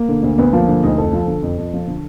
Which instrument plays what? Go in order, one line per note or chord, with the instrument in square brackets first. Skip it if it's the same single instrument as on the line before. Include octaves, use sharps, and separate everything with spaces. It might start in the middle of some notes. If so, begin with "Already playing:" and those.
Already playing: [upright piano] A#3
D3
D2
D2 B3
F3 A#3
D3 A#3
D2 D#4
F2 A4
F3
D3
F2
F2
F3
D3